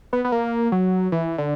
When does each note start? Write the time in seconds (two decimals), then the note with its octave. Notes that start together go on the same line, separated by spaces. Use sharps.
0.13 B3
0.24 B3
0.32 A#3
0.72 F#3
1.12 E3
1.38 D3